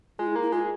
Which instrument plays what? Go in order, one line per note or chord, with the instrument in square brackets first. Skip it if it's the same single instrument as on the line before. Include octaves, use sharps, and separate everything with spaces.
[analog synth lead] G#3 [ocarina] F4
[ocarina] E4
[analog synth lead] A#3
[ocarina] E4
[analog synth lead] G#3 [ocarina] F4